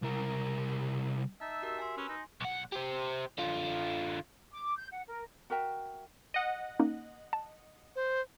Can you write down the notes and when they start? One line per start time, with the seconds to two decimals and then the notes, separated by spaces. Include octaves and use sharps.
0.02 C2 A#4
1.41 D#4 E5 A5 E6
1.62 F#4 G4 A#4
1.79 G#5 C6
1.97 C#4 B4 E6
2.09 D#4
2.41 B1 F#5
2.72 G4 C5
3.38 D3 F4
4.53 D6
4.78 G6
4.92 F#5
5.08 A#4
5.50 F#4 A#4 E5 G5
6.34 D#5 F#5
6.80 A#3 C#4 D#4
7.33 A5
7.96 C5